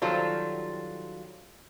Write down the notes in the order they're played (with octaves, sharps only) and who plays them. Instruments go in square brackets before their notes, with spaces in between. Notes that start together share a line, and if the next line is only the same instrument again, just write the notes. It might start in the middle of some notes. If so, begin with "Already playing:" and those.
[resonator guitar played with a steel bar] D#3 F#3 G3 F4 A4 C5